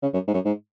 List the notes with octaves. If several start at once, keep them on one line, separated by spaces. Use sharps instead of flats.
C#3
F#2
G#2
F#2
G#2